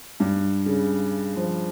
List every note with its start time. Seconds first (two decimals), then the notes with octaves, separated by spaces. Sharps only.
0.20 G2
0.66 C#3
1.36 F3